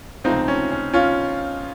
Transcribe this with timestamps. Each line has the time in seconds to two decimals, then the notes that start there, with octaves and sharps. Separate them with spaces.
0.24 C#2 C3 F3 A3 C4 D#4
0.48 C#4
0.72 C#4
0.94 C#4 F4